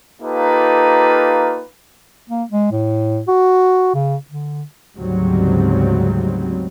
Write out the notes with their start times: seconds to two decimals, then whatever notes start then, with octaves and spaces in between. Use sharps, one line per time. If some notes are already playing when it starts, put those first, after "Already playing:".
0.21 A#3 D#4 F4 G4 A4 B4
2.30 A#3
2.50 G#3
2.72 A2
3.28 F#4
3.95 C#3
4.30 D3
4.96 D2 G#2 C#3 F#3 G3 C4